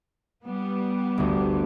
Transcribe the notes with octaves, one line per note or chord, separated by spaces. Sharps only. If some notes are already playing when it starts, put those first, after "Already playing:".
G3 B3
G1 D2